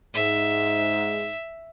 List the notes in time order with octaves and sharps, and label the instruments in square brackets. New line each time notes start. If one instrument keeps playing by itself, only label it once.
[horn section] G#2 [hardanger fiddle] E5